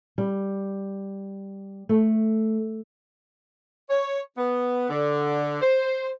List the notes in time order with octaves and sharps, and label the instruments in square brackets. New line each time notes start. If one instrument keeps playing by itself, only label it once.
[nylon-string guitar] G3
A3
[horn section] C#5
B3
D3
C5